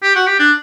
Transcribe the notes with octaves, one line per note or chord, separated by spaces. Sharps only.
G4
F#4
G4
D4